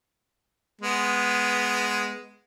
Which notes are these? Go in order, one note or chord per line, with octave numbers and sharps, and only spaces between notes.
G#3 B3